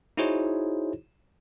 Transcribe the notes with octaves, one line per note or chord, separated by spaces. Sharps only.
D#4 E4 F#4 G#4 C5 C#5